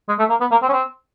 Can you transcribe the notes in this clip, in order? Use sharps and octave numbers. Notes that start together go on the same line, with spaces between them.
G#3
A3
A#3
B3
A#3
C4
C#4
C4